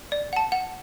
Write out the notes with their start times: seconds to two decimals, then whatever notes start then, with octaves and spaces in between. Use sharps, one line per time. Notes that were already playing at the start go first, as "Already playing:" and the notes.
0.12 D5
0.33 F#5 A5
0.52 F#5